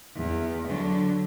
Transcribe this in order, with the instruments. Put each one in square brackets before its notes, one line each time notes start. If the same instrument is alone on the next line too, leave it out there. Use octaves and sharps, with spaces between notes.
[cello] E2
D3 F#3